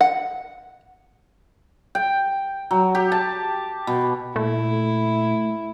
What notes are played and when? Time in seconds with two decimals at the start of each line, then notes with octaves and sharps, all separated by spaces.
0.01 F#5
1.95 G5
2.71 F#3
2.95 G4
3.12 A5
3.87 B2
4.36 A#2 A3 E4